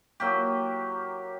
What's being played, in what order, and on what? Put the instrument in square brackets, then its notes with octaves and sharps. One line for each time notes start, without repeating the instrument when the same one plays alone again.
[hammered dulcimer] F#3 A#3 G4